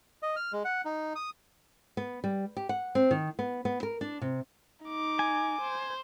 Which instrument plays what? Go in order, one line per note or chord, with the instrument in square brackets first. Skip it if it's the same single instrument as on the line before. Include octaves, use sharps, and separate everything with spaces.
[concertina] D#5
F6
G#3
F#5
D#4
D#6
[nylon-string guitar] B3
G3
G4
F#5
C4
D#3
B3
B3
A#4
D4
C3
[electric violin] D#4 D6
[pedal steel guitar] G#5
[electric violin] C5